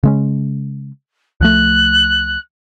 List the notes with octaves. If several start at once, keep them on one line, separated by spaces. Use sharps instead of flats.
C#3 G#3 C#4
C#2 F3 A3 F#6